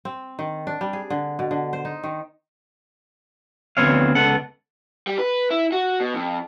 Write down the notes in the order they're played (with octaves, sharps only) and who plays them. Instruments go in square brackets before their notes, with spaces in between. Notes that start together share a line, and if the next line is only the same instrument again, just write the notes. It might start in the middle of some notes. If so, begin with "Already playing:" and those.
[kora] C4
D#3
D4
G3
G#4
D3
B2
D3
C5
D#4
D#3
[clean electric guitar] D2 C3 B3 C4 C#5 F5
C#2 B3 A4 F#5
[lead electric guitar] G3
B4
E4
F#4
B2
F2